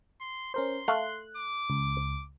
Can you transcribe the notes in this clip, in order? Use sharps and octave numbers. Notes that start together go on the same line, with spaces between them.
C6
C#4 A#4 C5 C6
A3 F5 F#6
D6
C#2